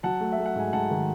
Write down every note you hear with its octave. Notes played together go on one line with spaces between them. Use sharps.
F#3 F#5 A5
A3
E5
A3
F#5
G#2 G#5
G#2 F#5 A5
D#3